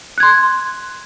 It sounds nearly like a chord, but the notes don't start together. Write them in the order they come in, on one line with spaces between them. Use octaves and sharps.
F#6 G#6 C6